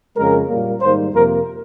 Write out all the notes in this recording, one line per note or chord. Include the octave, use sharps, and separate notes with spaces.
F2 C#3 G#3 A#4
A#2 G3 A#3
G#2 D#3 G3 A#3 C5
F2 C3 F3 A#3 A#4